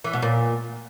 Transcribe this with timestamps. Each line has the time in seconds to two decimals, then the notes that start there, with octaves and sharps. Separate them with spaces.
0.04 E3
0.13 B2
0.22 A#2